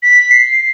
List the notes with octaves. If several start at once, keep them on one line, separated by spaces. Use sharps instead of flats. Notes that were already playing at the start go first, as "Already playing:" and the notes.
B6
C7